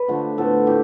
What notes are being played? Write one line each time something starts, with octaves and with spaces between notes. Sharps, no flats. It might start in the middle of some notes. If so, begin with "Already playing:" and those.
Already playing: B4
D3 F3 A3
A2 F3 B3 A4
A2 G4